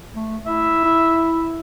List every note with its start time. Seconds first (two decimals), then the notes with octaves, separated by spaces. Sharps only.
0.15 A3
0.47 E4 E5
0.85 E4